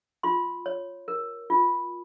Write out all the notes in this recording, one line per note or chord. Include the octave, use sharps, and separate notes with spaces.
F4 C6
C#5
A#4
F4